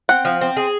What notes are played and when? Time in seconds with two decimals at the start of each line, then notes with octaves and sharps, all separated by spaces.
0.09 C4 F#5
0.25 F3
0.41 C4
0.57 G#4